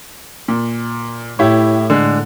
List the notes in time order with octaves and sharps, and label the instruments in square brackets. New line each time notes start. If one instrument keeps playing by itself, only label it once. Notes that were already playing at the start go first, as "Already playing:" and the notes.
[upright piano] A#2
[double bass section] A2 [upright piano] E4 G4 C#5
[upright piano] D3 G#3